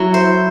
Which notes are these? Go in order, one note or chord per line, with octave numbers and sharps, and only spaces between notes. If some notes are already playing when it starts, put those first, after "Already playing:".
Already playing: F#3 E4 F#4
C5